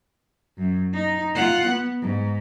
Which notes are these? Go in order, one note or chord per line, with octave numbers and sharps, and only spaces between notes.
F#2
D#4
F4 F#5
B3
G#2